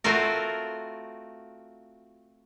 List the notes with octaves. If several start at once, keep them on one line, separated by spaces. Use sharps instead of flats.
A3 C4 F4 F#4 A#4